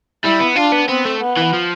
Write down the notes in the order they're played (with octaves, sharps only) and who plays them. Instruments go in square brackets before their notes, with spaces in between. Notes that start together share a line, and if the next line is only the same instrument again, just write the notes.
[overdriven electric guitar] G3 [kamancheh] E4
[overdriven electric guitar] B3
[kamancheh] D4 [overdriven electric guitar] F4
[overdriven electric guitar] B3
[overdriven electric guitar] B3 [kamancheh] C4
[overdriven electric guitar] A3
[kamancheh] B3
[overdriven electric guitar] E3
F3